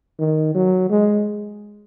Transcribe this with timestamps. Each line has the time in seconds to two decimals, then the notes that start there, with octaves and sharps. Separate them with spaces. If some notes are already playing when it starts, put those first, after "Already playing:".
0.19 D#3
0.55 F#3
0.90 G#3